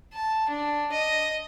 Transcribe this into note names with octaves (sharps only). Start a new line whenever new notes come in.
A5
D4
D#5